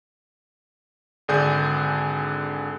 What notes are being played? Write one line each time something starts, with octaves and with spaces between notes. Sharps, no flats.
G#1 D3 D4 G#4 G6